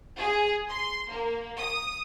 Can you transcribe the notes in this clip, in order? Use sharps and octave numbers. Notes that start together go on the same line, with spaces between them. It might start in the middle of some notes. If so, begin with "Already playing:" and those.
G#4
C6
A#3
D#6